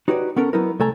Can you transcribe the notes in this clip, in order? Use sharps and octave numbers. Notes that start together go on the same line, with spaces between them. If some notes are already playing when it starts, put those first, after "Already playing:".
D#4 F#4 G4 B4 C#5 D5
B3 C#4 A4 A#4
F#3 B3 D#4 E4 A#4
C2 A3 A4 G#5 A#5